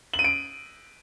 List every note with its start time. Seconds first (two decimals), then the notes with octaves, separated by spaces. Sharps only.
0.14 F#7
0.19 D#7
0.24 D7